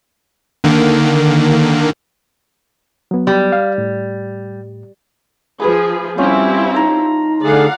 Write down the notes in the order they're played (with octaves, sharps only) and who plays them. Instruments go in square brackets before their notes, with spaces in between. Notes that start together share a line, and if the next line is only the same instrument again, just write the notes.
[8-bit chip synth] D3 D#3 A#3
[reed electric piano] F#3 B3
[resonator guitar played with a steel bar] G3
[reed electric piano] F5
A2
[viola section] F3 G#4 [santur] B4 B5
[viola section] G3 C4 E4 [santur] C#4 F4
[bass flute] D#4 [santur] A5 A#5 C6
[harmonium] D3 A3 G#4 [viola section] D5 F5 F#5